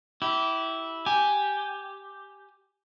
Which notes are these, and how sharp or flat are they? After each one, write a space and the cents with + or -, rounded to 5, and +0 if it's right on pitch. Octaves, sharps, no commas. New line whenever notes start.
E4 -10 G4 -25
G4 +0 G#5 +0